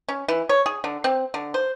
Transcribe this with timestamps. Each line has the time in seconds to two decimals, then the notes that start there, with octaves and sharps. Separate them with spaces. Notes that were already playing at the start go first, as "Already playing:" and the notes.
0.08 C#4
0.28 E3
0.49 C#5
0.66 G#4
0.84 D3
1.04 C4
1.34 D3
1.54 C5